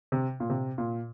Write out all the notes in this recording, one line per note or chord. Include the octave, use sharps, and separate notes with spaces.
C3
A#2
C3
A#2